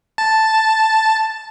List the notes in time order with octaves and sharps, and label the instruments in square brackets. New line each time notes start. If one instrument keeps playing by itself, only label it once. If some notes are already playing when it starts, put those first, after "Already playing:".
[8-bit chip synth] A5